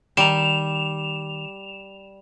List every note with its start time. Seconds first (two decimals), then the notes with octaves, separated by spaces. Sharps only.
0.17 D#3 G3 A#5 E7 F7